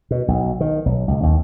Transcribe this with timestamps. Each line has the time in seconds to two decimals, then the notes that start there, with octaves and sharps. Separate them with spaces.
0.11 B2
0.28 B1
0.60 D#3
0.86 B1
1.08 C#2
1.23 D#2